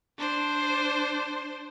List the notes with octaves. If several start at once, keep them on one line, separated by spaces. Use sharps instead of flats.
D4 C5